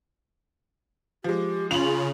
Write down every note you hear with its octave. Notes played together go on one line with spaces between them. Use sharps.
F3 G#3 G4
C#3 F4 F7 F#7